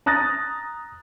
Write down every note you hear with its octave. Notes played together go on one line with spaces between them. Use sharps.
A#5 D#6 F#6 A6 A#6